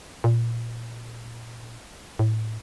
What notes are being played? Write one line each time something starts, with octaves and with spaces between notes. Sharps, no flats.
A#2
A2